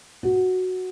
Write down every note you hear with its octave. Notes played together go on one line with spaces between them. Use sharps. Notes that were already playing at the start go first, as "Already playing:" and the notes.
F#4